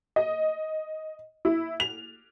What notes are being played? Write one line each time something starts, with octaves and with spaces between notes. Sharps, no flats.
D#5
E4
F7